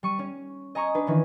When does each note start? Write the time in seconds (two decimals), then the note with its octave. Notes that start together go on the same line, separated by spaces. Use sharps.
0.03 G3 C#6 D#7
0.19 C#4
0.75 D#5 G#5 A#5 C#6 D#6
0.95 D4 B4
1.07 D#3 E3 C#4